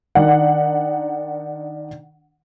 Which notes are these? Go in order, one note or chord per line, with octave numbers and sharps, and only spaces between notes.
D#3 D4 F#5